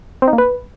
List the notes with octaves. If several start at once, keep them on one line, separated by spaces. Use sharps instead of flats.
C4
D#4
A#3
B4